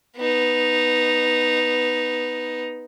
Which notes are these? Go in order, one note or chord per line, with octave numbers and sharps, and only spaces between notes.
B3 D#4